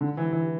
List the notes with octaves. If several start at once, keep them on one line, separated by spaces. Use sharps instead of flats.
D3
E3
E3